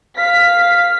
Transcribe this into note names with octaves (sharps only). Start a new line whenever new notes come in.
F5 B6